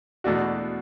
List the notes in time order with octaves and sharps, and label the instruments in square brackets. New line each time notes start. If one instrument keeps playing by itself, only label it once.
[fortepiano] E2 B2 A3 D4 F#4